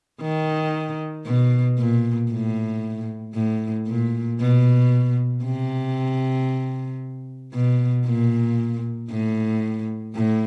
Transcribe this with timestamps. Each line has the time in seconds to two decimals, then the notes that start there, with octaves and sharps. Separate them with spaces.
0.21 D#3
1.26 B2
1.78 A#2
2.31 A2
3.35 A2
3.87 A#2
4.40 B2
5.45 C3
7.53 B2
8.06 A#2
9.10 A2
10.15 A2